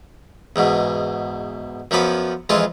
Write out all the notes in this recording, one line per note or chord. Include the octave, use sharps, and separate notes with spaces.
E2 G#2 B2
F#2 F3 F#3 B3 B5 D6
F2 E3 G#3 F4 C6